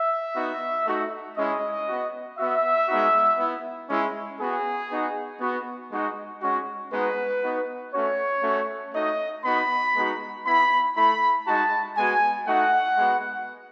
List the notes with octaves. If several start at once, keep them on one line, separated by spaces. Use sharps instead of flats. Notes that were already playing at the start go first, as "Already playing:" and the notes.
Already playing: E5
B3 D#4 F#4
A3 D#4 F#4
G#3 C#4 E4 D#5
B3 F#4
B3 F#4 E5
G#3 B3 D#4 F#4
B3 E4
G#3 C#4 E4
B3 F#4 G#4
B3 D#4 F#4
B3 F#4
G#3 D#4 F#4
G#3 C#4 F#4
G#3 B3 D#4 F#4 B4
B3 D#4 F#4
A3 C#4 F#4 C#5
A3 C#4 F#4
A3 D#4 F#4 D#5
B3 D#4 F#4 B5
G#3 B3 D#4 F#4
B3 E4 B5
A3 E4 B5
G#3 D#4 F#4 A5
G#3 B3 F#4 G#5
A3 D#4 F#4 F#5
G#3 B3 F#4